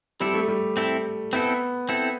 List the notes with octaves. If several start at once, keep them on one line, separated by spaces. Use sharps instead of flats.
G3 C4 E4 A4
A3
G3
C4 E4 A4
B3 C4 E4 A4
C4 E4 A4